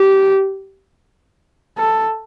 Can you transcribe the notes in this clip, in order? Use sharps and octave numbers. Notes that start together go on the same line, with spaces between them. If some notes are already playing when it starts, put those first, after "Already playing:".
Already playing: G4
A4